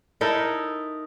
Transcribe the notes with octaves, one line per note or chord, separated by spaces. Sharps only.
D#4 E4 A4 A#4